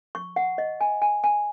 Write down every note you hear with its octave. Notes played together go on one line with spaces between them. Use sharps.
C#6
F#5
D#5
G#5
G#5
G#5